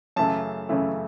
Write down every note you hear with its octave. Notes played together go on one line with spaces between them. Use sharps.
F#2 C#3 E3 A3 A5
F#2 C#3 E3 A3